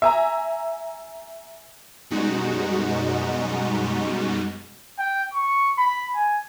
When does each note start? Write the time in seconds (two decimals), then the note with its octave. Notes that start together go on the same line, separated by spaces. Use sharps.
0.02 E5 G#5 A#5
2.10 F#2 B2 G3 G#3 D#4 F#4
4.99 G5
5.34 C#6
5.78 B5
6.15 G#5